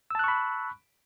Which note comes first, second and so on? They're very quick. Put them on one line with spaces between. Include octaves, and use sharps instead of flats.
E6 A5 F#6 C#6 B5